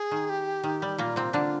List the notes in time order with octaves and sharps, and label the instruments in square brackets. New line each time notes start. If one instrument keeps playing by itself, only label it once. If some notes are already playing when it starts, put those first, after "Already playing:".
Already playing: [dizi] G#4
[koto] D#3
[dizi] G4
[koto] D#3
G3
[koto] A#2 A#3 [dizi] F4
[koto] C3 C4
[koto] D3 D4 [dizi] F4